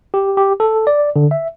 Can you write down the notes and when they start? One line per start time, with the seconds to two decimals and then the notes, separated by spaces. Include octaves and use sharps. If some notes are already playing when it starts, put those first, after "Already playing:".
0.14 G4
0.37 G4
0.60 A4
0.87 D5
1.16 D3
1.31 E5